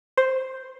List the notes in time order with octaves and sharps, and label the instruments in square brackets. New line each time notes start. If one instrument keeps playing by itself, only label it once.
[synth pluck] C5